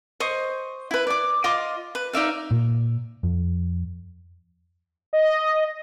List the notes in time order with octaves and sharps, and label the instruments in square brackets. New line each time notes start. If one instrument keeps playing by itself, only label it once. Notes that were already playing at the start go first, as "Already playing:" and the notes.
[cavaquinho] C5 D#5 C#6
E4 B4
D5 D6
F4 D#5 C6 D6
B4
D#4 D5 E5 F5
[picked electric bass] A#2
F2
[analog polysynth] D#5